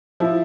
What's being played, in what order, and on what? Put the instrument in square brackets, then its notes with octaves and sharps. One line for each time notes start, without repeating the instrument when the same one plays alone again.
[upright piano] F3 E4